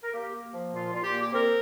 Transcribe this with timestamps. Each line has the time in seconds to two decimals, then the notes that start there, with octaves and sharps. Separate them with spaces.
0.04 A#4
0.13 A#3 G4
0.33 A#3
0.53 F3
0.73 A#2 F4
0.93 A#2 F4
1.03 G4
1.13 A#3
1.22 G4
1.33 C4 A#4